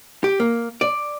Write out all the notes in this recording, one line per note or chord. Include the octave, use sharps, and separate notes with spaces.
G4
A#3
D5